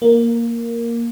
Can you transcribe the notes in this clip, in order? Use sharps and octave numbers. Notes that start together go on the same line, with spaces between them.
A#3